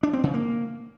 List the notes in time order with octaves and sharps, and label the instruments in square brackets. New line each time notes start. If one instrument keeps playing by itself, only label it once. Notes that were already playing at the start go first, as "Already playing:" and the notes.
[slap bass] D4
C4
C#3
A#3